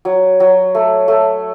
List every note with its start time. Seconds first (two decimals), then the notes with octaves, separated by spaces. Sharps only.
0.05 F#3
0.40 F#3
0.75 A3
1.08 A3